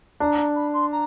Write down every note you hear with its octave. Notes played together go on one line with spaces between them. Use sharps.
D4 A#5
B5
C6
A#5